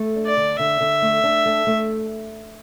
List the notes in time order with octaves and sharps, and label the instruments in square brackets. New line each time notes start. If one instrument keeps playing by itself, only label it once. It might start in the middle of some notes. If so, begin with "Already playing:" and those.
Already playing: [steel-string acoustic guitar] A3
D4
[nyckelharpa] D5
[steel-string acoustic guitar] D3
[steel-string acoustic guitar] D3 [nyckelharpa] E5
[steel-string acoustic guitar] D3
A3
D4
A3
A3